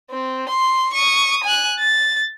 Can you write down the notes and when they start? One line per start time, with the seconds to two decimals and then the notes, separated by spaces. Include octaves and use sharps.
0.10 C4
0.49 C6
0.93 C#6 D#6
1.43 G#5 F#6
1.80 A6